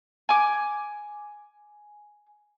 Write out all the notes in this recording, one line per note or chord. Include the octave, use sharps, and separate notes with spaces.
G#5 D6